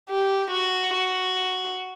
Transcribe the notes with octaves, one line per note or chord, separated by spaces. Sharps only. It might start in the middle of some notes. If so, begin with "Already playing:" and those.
G4
F#4
F#4